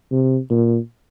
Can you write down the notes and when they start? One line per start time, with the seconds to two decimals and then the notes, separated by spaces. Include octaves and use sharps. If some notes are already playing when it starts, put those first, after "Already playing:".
0.11 C3
0.50 A#2